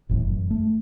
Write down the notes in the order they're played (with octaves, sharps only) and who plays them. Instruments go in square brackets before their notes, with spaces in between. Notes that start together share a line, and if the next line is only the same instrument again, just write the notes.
[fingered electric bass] F#1 F2 A2 E3
F#2
A3